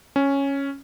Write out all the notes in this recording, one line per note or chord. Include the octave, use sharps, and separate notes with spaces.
C#4